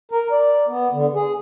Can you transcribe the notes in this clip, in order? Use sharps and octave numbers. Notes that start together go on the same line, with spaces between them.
A#4
D5
B3
D3
G#4